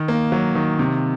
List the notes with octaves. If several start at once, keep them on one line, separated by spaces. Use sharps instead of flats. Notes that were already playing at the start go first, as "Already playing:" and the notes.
Already playing: D#3
A#3
F#3
D#3
C3